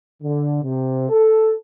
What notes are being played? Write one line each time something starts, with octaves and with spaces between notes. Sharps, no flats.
D3
C3
A4